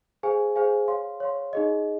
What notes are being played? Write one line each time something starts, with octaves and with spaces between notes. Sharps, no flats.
G#4 C5 F5 G#5
G#4 C5 F5 G#5
C#5 F5 C6
C#5 F5 C6
D#4 G#4 D#5